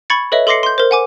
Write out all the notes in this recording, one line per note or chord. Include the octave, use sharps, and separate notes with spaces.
B5 C#6 G#6 A6 C#7
A4 B4 C#5 D#5 E5
A4 C6 D6 A#6 C7 C#7
C6 G6
A#4 C5
F#5 G#5 D6